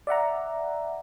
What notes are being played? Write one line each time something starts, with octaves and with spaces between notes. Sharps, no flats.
D5 E5 F#5 A#5